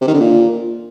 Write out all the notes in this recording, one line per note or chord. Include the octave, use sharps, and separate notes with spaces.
C3
D#3
D3
A#2